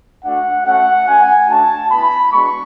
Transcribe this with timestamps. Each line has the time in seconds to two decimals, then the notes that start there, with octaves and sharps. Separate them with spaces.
0.25 A3 D4 F#4 F#5
0.66 A3 C#4 F#4 F#5
1.07 A3 C#4 F#4 G#5
1.49 A3 D4 F#4 A5
1.90 B3 E4 B5
2.32 G#3 B3 D4 F#4 C#6